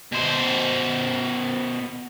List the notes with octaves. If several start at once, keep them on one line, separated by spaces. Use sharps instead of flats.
B2 C5